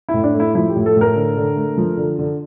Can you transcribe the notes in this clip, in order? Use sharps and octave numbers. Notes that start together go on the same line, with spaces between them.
E4
A2
D4
A3
E4
F3 E4
G4
A2
A4
A2
A#4
D3
D3
A3
F3
D3
D3